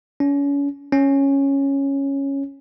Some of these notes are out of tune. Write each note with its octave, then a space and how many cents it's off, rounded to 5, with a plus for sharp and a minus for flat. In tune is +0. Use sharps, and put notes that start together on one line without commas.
C#4 +35
C#4 -5